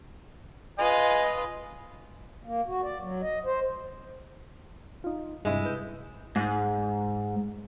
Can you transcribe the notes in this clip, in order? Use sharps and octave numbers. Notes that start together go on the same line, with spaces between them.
F4 B4 D#5 G#5
A#3
F#4
D5
F#3
D#5
C5
D#4 F4
G2 C3 G#3 E4
B4 G6
G#2